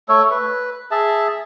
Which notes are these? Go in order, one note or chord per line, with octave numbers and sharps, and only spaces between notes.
A3 A4 C#5
B4
G#4 E5 A5